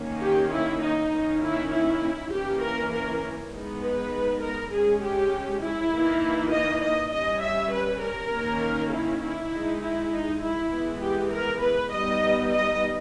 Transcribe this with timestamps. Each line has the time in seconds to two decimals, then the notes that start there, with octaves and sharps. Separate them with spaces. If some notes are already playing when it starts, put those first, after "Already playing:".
Already playing: D#3 A#3 C#4
0.22 G4
0.52 E4
0.82 D#4
1.12 D#3 A#3 C#4
1.42 E4
1.72 E4
2.32 E3 A#3 C#4 G4
2.62 A#4
2.92 A#4
3.52 G#3 B3 D#4
3.82 B4
4.42 A#4
4.72 G#3 C#4 G#4
5.02 G4
5.62 E4
5.92 E3 A#3 D#4
6.52 D#5
6.82 D#5
7.12 G3 C#4 D#5
7.42 E5
7.72 B4
8.02 A#4
8.32 D#3 A#3 C#4
8.92 E4
9.22 E4
9.51 G#3 D#4
9.81 E4
10.12 D#4
10.42 E4
10.71 E3 G#3 B3
11.02 G4
11.32 A#4
11.61 B4
11.91 G3 B3 D#4 D#5
12.51 D#5